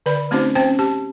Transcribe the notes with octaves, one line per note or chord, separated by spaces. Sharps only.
D3 B4 D5 B5
A3 C4 C#4 D#4 F#4 C5
C4 C#4 C5 G5
G4 A5